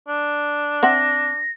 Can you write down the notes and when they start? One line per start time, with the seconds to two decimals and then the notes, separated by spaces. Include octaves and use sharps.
0.08 D4
0.83 C4 E5 F#5 A#6